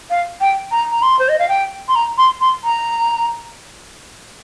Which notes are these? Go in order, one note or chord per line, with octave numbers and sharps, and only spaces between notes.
F5
G5
A#5
A#5
C6
C5
D#5
F5
G5
C6
A#5
C6
C6
A#5